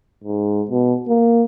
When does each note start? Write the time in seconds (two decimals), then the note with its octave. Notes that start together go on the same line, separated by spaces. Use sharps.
0.24 G#2
0.70 B2
1.08 A#3